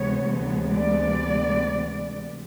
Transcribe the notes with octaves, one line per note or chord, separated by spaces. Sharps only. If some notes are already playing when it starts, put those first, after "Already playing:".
Already playing: D2 C3 E3 G#3 B3 C#5
D5